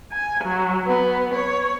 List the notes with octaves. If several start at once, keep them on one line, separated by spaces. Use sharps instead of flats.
G#5
F#3
B3
C#5